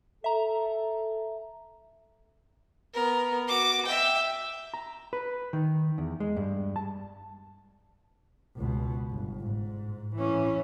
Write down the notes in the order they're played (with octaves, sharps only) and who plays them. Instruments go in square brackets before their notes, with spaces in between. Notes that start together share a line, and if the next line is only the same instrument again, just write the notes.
[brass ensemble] A4 [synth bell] E5 A#5
[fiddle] B3 A#4
F#4 D6
E5 G5
[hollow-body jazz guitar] A#5
B4
D#3
E2
G#3
G2
A5
[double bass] C#2 B2
G1
G#2
E3 C#4